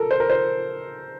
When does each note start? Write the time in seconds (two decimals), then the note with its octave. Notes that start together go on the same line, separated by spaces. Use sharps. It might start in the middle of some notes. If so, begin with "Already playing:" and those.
Already playing: A4 A#4
0.11 C5
0.20 A#4
0.30 C5